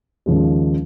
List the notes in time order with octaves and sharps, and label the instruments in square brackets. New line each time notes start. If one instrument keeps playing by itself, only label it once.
[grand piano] D#2 C#3 F3 G#3